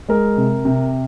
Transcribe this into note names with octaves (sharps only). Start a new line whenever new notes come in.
G#3 A#4
C3
C3